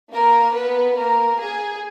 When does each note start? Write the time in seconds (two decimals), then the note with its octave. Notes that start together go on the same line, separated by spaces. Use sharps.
0.11 A#3 A#4
0.53 B3 B4
0.96 A#3 A#4
1.38 G#4